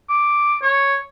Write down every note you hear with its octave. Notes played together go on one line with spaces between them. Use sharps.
D6
C#5